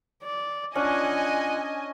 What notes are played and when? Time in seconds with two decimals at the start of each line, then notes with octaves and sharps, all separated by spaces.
0.23 D5
0.75 C#4 D4 F4 D#5 F#5 G#5